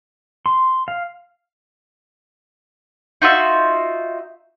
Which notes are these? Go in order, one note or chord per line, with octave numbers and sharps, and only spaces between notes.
C6
F5
D#4 F4 F#4 E5